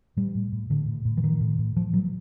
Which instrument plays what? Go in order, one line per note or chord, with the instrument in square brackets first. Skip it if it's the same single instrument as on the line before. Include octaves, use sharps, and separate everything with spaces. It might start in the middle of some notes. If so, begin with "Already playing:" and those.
[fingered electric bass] A2 G3
A2
A2
A2 D3
A2
A2
E3
A2 D#3
A2
A2
A2 F3
A2 F#3